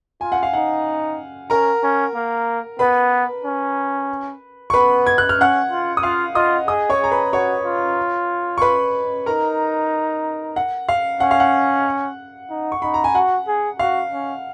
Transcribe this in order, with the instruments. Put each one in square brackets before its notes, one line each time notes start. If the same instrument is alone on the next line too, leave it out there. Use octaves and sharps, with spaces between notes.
[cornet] F4 [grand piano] G#5
[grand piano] F#5
F5
[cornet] D#4 [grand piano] F#5
[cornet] C#4 [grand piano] A#4 A#5
[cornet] C#4
A#3
[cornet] B3 [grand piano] B4 B5
[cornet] C#4
[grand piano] C#6
[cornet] B3 [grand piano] B4 B5
[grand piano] G#6
F#6
F6
[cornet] C#4 [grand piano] F#5 F#6
[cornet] F4
[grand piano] D#6
[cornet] F4 [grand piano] F5 F6
[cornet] F4 [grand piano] D#5 D#6
[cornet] G#4 [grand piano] D#5 D#6
[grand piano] C#5 C#6
[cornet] G#4 [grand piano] A#5
[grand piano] B4 B5
[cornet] F#4 [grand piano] C#5 C#6
[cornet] F4
[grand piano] C#6
B4 B5
[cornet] D#4 [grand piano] A#4 A#5
[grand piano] F#5
F5
[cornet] C#4 [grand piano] F#5
[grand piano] F5
F#5
[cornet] D#4
[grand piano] C#6
[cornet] D#4 [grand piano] B5
[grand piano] A#5
G#5
[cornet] F#4 [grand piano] F#5
[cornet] G#4
[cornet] F#4 [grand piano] F5
[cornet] C#4